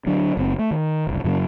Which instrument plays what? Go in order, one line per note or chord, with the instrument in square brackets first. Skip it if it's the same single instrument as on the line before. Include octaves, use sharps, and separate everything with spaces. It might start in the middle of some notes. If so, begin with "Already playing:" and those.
[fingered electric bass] D3 F#3 D4
F#1 A#2 C4
A3
D#3
F#1 C2
F#2 C#3 F#3 A#3